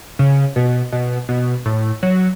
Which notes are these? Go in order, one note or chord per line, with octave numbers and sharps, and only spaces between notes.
C#3
B2
B2
B2
A2
F#3